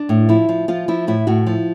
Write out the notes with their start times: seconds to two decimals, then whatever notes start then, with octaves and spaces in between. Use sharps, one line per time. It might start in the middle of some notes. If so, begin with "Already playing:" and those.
Already playing: D4
0.09 A2
0.29 F3 E4
0.49 F3
0.68 F3 F4
0.88 F3 E4
1.07 A2 E4
1.27 A2 F#4
1.47 F3